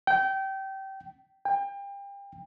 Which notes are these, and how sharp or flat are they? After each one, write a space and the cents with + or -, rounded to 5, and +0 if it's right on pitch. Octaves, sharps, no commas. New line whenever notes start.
G5 -25
G5 +30